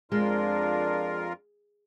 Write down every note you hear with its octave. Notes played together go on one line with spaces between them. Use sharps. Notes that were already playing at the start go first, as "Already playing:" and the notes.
F2 G#3 D4 F4 A#4